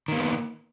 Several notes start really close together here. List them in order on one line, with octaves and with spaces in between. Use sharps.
D#3 A#3 B3